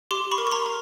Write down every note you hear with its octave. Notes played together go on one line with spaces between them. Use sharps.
G4 C6 D6
B5 C#6
A#4
C#6
A#5 C6
A#4